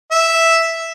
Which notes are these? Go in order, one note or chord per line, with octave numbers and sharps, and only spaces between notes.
E5